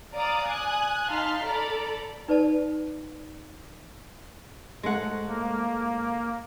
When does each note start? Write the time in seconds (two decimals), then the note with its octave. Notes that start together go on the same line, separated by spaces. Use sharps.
0.13 D5 F5 A#5 D6 D#6
0.45 G#5 D#6 F#6
1.10 D#4 F5 A5 C6 F6 B6
1.44 A4 D5 A#5 B5
2.28 D#4 B4 D5 A5
4.83 G#2 G#3 A3 A4 F#5
5.28 A#3